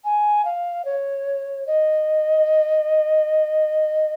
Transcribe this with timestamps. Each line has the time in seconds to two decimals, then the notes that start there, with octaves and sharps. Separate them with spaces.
0.04 G#5
0.45 F5
0.85 C#5
1.67 D#5